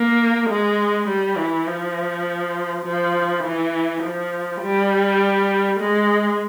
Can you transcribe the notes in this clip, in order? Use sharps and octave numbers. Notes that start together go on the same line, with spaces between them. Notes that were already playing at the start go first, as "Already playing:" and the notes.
Already playing: A#3
G#3
G3
E3
F3
F3
E3
F3
G3
G#3